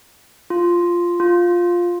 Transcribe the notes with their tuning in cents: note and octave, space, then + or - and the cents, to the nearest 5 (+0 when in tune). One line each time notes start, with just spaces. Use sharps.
F4 -5
F4 +5